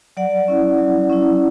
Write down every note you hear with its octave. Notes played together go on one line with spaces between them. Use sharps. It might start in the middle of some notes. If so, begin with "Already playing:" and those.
F#3 D5 F#5
C#4 E4
F#3
C#4 E4